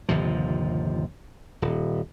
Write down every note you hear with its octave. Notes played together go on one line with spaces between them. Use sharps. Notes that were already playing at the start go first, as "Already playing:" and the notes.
G1 D#2 C3 F3
D#1